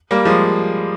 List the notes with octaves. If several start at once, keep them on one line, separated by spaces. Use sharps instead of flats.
G3 A#3
F3 G#3